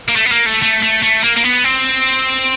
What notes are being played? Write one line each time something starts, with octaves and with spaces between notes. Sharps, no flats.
A#3
A3
B3
A#3
A3
A3
A3
A3
A#3
A#3
B3
C4